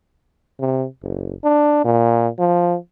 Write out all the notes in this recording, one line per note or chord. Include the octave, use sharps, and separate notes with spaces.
C3
F#1
D4
A#2
F3